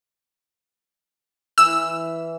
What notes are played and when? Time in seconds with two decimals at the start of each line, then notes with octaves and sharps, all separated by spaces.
1.58 E3 E6